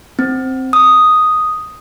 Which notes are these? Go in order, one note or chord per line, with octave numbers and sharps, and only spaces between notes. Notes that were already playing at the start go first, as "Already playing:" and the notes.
C4
D#6